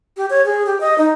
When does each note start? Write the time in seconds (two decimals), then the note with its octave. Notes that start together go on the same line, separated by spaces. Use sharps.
0.17 G4
0.30 C#5
0.45 G#4
0.66 G4
0.81 D#5
0.98 D#4